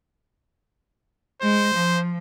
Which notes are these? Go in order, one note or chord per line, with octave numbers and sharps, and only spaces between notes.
G#3 C5
F3